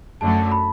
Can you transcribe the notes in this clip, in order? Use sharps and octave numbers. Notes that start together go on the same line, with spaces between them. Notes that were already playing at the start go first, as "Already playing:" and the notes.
F#2 D3 F#3 A3 A5
B5